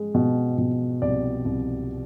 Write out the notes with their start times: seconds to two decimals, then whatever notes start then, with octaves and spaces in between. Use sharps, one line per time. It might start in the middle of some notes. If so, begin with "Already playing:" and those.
Already playing: G#3
0.15 B2
0.58 B2
1.02 C2 D5
1.45 C2